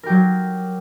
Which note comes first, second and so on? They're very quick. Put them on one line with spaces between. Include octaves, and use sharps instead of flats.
A#4 G4 F#3